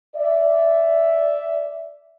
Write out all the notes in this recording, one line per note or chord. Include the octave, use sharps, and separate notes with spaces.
D5 E5